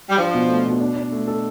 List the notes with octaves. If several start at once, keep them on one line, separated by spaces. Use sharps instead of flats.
G3
F3 D4
B2
A3
B2
D4
D4
A3
A4